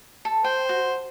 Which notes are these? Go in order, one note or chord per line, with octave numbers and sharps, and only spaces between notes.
A4
C5 G5
F#4